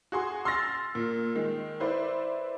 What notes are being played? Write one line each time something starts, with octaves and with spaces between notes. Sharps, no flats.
F#4 G#4 C6
C6 E6 F6 A6 A#6
A#2
D#3 G#3
E4 B4 C5 D5